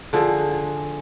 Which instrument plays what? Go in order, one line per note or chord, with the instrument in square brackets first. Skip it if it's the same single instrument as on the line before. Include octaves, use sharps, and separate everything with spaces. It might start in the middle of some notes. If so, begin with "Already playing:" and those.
[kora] D3 F3 G#4